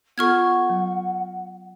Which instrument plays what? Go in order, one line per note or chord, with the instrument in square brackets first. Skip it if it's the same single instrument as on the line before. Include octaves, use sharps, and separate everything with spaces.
[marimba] B3 F4 A4 [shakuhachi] F#5 [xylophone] C#6 F6 G#6
[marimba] F#3